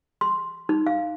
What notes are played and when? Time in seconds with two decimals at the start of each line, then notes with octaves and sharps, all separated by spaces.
0.21 C6
0.69 D#4
0.87 F5